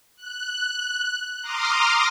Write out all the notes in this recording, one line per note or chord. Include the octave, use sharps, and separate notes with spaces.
F#6
A#5 C6 D6 D#6 F6